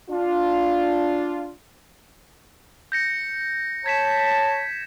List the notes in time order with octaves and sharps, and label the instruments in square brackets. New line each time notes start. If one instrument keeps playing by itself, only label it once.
[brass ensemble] D4 F4
[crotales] G6 A#6 C#7
[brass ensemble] C#5 A5 [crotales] G#6 B6 E7